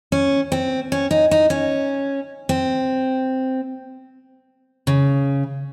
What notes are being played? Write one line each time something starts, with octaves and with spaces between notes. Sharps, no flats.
C#4
C4
C#4
D#4
D#4
C#4
C4
C#3